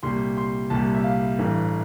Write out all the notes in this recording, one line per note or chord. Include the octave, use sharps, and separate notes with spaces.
C2 A#2 G3 C6
C6
C2 A#2 G3 A5
E5
F5
A1 G2 E3